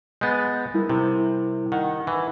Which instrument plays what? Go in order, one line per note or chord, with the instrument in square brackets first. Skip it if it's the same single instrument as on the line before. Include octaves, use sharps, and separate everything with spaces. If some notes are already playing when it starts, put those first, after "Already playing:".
[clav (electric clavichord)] G#3 B3 [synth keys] G6 A6
[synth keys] G3 E4 A#4
[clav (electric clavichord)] C3
[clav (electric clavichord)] D#3 [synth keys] F#5
[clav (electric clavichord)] E3